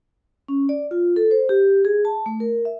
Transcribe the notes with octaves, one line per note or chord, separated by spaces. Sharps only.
C#4
D5
F4
A4
C5
G4
G#4
A5
A3
A#4
E5